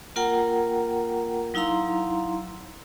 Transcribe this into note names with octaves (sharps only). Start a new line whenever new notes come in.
A#3 F4 A#4 F#5 G5 A#5
F#3 D#4 E4 F5 A#5 C6